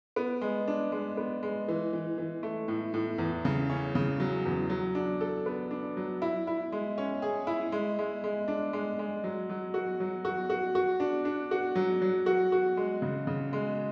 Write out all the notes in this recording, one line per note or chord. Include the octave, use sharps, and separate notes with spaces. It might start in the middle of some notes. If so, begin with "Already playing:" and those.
B3
G#3
D4
G#3
B3
G#3
E3
E3
E3
A3
A2
A2
E2
C#3
C#4
C#3
F#3
E2
F#3
D4
A4
B3
D4
F#3
E4
E4
G#3
C#4
G#4
E4
G#3
G#3
G#3
D4
G#3
G#3
F#3
F#3
F#4
F#3
F#4
F#4
F#4
D4
D4
F#4
F#3
F#3
F#4
F#4
G#3
C#3
C#3
G#3